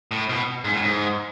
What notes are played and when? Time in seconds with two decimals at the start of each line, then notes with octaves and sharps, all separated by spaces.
0.11 A2
0.29 B2
0.64 G#2
0.73 A2
0.82 G#2